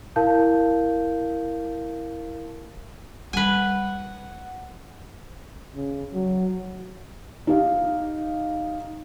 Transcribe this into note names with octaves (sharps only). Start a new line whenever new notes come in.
E4 A#4 F5 A5 G6
G3 B4 F#5 G#5
C#3
F#3
D#4 G4 F5